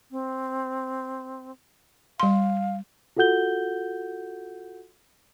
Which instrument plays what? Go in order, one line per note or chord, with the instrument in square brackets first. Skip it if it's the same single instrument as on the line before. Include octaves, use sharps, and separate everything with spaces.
[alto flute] C4
[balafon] G3 C6 [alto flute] F5
[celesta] F4 F#4 A4 F#5 G6 G7